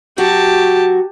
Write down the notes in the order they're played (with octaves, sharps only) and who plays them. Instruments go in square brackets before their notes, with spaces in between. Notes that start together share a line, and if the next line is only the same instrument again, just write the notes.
[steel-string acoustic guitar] F#3 F#4 [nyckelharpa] G4 A5